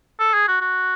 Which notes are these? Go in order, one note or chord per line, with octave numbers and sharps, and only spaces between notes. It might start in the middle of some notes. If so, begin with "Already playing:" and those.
A4
G#4
F#4
F#4